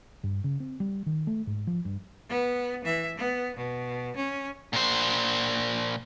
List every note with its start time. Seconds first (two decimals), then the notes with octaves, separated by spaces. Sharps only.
0.23 G2
0.44 C#3
0.60 C4
0.80 G3
1.06 D#3
1.27 A3
1.47 G#2
1.67 F3
1.85 G2
2.29 B3
2.84 E3 E5
3.17 B3
3.56 B2
4.16 C#4
4.73 A#2 C5